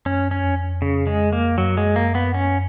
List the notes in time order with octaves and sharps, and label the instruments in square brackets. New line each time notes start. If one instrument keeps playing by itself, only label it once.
[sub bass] F#2 [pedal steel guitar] C#4
[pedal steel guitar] C#4
[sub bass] F2
[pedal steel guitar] C#3
G#3
A#3
[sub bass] F#2 [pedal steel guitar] F#3
[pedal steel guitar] G#3
A#3
B3
C#4